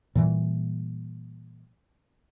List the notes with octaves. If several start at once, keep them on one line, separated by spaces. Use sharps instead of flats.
A#2 E3 G3